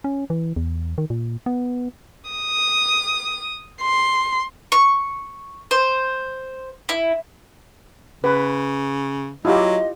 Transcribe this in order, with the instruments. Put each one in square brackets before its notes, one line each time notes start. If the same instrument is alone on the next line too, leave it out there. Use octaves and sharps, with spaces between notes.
[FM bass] C#4
E3
E2
D#3
A#2
B3
[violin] D#6
C6
[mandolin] C#6
C5
E4
[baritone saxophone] C#3 [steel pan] B4
[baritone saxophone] F#3 [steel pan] E4 F4 G4 [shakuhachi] D#5